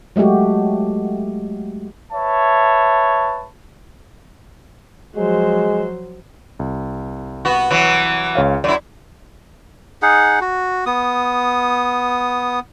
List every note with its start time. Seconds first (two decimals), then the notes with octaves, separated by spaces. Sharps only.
0.16 F#3 G#3 A3 F#4 G4
2.12 B4 C#5 E5 A5
5.17 F3 F#3 G#3 C5
6.59 C2
7.45 B3 F#4
7.71 E3 F#3
8.35 C#2 C#5 F5
8.64 F#2 E4 D5
10.02 D#4 G#4 F#5
10.41 F#4
10.86 B3 D#6